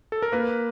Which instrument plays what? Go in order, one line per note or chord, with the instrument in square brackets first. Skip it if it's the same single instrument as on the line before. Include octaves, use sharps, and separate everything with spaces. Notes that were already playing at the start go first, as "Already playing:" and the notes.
[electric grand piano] A4
A#4
[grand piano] A#3 [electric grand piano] B4